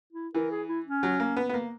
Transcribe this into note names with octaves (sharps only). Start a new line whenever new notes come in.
E4
E3 A#4
G#4
E4
C#4
F#3
A#3
B3
B3
A#3